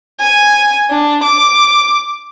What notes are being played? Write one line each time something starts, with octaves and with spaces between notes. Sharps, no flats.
G#5
D4
D6